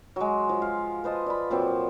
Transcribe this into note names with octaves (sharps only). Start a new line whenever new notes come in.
F#3 G#3
F3
F5
B4 C5 D#5 A5
D5 B5
A#2 F3 F#3 C4